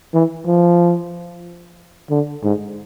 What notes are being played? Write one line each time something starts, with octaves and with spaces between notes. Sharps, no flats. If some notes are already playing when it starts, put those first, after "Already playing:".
E3
F3
D3
G#2